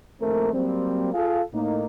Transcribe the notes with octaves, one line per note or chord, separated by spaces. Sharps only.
A#1 D#2 A3 A#3 C4 A#4
F#3 G3 A#3 C4
F4 G#4 A4 F5
A2 A#3 D#4